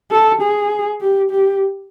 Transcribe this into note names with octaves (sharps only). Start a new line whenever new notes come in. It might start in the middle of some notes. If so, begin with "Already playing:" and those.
A4
G#4
G4
G4